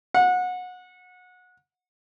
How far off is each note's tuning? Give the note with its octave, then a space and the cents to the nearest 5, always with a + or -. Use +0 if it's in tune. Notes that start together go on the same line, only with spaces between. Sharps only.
F#5 -25